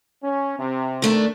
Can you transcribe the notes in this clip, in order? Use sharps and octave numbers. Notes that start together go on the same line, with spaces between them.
C#4
C3
D#3 A3 D4